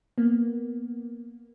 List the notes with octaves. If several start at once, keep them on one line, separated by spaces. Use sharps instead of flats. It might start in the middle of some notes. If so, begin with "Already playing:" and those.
A#3 B3